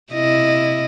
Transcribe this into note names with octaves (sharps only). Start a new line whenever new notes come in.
C3 E4 D#5